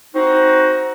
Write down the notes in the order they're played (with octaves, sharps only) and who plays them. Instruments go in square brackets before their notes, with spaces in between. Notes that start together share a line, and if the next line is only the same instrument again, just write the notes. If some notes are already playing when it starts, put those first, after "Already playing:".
[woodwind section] C4 D#4 F#4